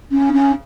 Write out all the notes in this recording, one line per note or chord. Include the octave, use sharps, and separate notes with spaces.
C#4
C#4